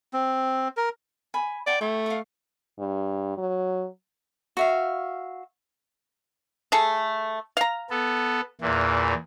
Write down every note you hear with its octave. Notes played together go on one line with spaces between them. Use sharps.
C4
A#4
G#5 B5
D5 F#5 G5 A5
A3 E4 G5 C#6
F5 C#6
G2
F#3
F#4 E5 F5
A3 G#4 A4
F5 A#5
B3 A4
E2 A#2 E3